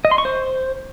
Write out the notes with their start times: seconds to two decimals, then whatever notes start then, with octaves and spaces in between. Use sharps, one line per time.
0.05 D#5
0.11 C6
0.18 C#6
0.25 C5